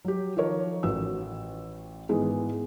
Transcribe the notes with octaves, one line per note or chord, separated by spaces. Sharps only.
F#3 G4
D#3 F3 A4 A#4 C#5
A1 F4 F#4 E6
G#2 D#3 E3 G#3 B3 G#4